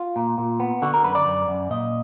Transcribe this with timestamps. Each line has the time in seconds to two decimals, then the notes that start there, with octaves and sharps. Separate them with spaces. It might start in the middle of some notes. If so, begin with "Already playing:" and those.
Already playing: F4
0.16 A#2
0.38 A#2
0.60 B3
0.82 D3 F#4
0.94 A#4
1.04 F#2 B4
1.15 D5
1.26 F#2
1.48 F#2
1.70 A#2 D#5